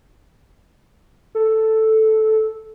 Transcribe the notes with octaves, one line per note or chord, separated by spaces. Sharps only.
A4